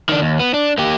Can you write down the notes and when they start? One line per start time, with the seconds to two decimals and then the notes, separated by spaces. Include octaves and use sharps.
0.09 D#3 D4
0.22 D#2
0.40 B3
0.54 D4
0.78 A#3 G4